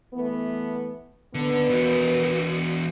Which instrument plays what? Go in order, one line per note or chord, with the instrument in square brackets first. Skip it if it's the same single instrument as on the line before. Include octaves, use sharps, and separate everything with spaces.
[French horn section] E3 A3 B3
[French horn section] D#2 B3 [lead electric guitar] D3
[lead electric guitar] E2 F#4